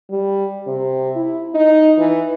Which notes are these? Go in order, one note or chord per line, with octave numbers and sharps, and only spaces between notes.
G3
C3
E4
D#4
E3